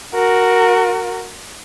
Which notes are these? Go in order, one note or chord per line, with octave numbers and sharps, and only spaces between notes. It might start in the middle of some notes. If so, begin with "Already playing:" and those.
F#4 A#4